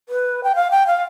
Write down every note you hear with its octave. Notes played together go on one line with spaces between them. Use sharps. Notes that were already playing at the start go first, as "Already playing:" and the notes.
B4
G5
F5
G5
F5